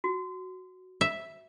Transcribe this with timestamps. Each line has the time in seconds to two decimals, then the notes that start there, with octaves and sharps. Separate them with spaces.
0.04 F#4
1.01 E5